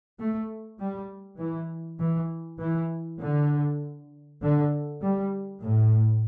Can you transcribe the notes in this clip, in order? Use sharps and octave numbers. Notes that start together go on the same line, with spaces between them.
A3
G3
E3
E3
E3
D3
D3
G3
A2